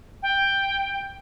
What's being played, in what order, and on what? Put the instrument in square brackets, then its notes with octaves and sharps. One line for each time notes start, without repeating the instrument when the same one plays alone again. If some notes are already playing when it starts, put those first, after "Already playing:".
[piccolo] G5